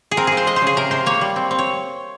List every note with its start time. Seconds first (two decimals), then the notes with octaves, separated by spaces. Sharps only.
0.11 G#4
0.17 C4 A#4
0.27 F3 G#4
0.37 C5
0.47 G#3 D#5
0.56 C5
0.62 C#3 G#4
0.77 C3 A#4
0.91 C3 C5
1.06 A#3 C#5
1.21 G3
1.36 C4
1.51 C4
1.59 C#5